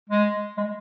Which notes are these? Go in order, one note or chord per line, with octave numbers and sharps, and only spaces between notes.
G#3
G#3